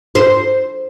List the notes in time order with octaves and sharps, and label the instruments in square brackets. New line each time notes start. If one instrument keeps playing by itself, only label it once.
[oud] C5